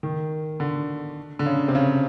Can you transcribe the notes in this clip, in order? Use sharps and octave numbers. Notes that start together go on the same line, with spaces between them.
D#3
D3
D3
C#3
C3
C#3